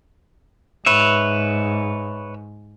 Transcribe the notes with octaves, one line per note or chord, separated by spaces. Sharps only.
G#2 B4 C#5 E5